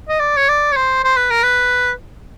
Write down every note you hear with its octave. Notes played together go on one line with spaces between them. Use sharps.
D#5
D5
C#5
D5
C#5
C5
C5
B4
A#4
B4